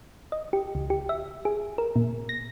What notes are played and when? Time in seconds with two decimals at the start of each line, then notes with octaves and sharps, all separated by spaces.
0.32 D#5
0.53 G4
0.75 C#2
0.90 G4
1.09 E5
1.45 G#4
1.78 A#4
1.96 A#2
2.29 A#6